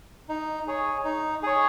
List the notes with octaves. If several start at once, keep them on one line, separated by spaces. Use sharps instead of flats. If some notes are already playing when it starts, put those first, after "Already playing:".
D#4
G#4 C#5
D#4
G#4 C#5